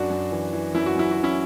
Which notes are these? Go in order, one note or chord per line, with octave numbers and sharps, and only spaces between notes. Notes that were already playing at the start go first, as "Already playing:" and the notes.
Already playing: F#2 D4 F#4
F#2
E3
E3
F#2 E4
F#4
F#2 E4
F#4
E3
C#4 E4